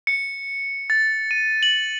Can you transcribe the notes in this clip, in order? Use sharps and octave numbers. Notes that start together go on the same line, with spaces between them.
C#7
A6
D#7
F#7